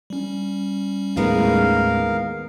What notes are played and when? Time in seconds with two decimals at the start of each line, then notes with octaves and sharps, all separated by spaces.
0.10 G3 C#4
1.17 D#2 A2 G#3 B3 D#4 A#4 F5